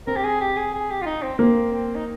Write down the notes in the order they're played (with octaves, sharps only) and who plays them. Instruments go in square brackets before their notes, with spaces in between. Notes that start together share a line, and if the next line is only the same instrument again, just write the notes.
[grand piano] C4 [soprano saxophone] A#4
[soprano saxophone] G4
G#4
G4
G#4
G#4
G4
F4
D#4
C4
[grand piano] A#3 [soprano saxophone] C4
[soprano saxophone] C4
D#4